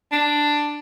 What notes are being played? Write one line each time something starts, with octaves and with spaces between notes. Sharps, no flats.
D4